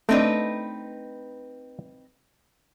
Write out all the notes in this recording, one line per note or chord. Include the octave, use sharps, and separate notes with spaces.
A3 C4 D4 D#4 B4